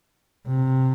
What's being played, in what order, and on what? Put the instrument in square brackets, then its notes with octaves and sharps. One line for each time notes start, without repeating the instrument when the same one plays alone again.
[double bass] C3